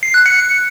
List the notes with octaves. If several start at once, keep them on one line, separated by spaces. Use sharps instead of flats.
C7
F#6
C#7